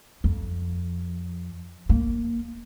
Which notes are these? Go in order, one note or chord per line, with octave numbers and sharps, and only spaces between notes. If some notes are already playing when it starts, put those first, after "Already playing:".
F2
A#3